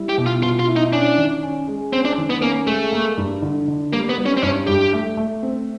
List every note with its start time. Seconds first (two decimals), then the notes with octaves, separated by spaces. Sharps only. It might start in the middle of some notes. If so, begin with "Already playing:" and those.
Already playing: G3 E4
0.09 G4
0.17 B2
0.26 F4
0.43 B2 F4
0.59 F4
0.68 E4
0.76 D#4
0.93 C#4 D4
1.18 D#3
1.43 C#4
1.67 G#3
1.93 C4 C#4
2.05 D4
2.18 D#3
2.30 B3
2.42 A#3 C#4
2.67 G#3 A3
2.92 A#3
3.17 G2
3.42 D3
3.68 D3
3.92 G3 A#3
4.09 B3
4.18 G3
4.26 C#4
4.37 C4
4.42 G2 C#4
4.67 G2 G4
4.93 A3
5.17 A3
5.43 C4